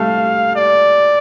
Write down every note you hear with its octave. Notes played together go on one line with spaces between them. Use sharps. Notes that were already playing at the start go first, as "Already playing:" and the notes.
Already playing: G3 A3 A4 F5
D5